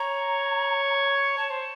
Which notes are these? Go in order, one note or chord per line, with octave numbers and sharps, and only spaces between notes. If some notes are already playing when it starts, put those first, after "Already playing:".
Already playing: C#5 A#5
C#5 A5
C5